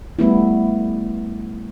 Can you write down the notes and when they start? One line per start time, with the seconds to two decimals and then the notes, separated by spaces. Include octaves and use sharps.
0.19 G3 A3 B3 E4